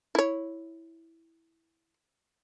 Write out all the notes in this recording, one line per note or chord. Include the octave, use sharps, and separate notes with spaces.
E4 C#5